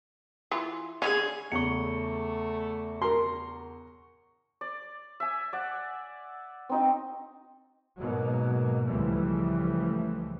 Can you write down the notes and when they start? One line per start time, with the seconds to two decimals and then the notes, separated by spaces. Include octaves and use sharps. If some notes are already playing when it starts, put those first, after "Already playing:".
0.51 E3 F4
1.02 D3 D#3 C#4 G#4 F5
1.52 E2 C#3 A3 C#6 C#7
3.02 A#4 C6
4.61 D5
5.20 E5 G#5
5.53 D5 F#5
6.70 C4 D#4 F#4
7.99 G#2 B2 F#3 A#3
8.87 C#2 A2 E3 F3 G3 A3